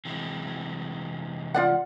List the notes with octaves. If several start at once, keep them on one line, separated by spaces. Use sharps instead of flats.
C3 E3 G#3
F4 D5 F#5